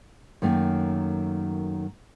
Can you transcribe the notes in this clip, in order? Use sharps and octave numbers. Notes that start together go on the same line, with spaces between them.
F#2 D#3 F#3 A3 A#3